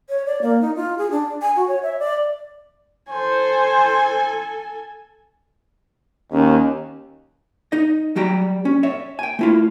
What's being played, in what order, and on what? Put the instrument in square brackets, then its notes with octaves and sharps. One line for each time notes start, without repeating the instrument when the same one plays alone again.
[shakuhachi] C#5
D5
A#3
D#4
F4
G#4
D4
G#5
F#4
C#5
E5
D5
[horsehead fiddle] A4 G#5 [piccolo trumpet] C5
[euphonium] D#2 [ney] C#4
[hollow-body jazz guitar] D#4 D#5
F#3 G3 G5 A#5
C#4
C#5 E5
G5 G#5
A3 E4 F4